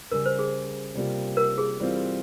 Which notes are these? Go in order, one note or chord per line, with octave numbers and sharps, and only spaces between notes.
C#3 G3 C#4 A#4
C5
G#4
C3 G3 A#3 F4
A#4
G#4
E3 G3 C4 F4